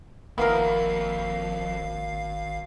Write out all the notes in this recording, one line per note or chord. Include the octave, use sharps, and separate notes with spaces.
G#1 F2 A#3 B3 E4 A#4 F5 C7